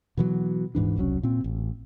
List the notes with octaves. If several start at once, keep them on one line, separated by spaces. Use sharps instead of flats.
B2 E3 F#3
D#1 G#2 E3 D4
E1 C2 F#3 C#4
A#2 C4
A1